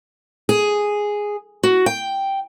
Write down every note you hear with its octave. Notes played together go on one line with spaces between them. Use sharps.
G#4
F#4
G5